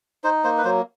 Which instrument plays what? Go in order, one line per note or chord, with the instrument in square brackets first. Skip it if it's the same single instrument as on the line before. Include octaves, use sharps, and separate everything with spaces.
[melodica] D#4 C5
A#3 C5
B4
F#3 C5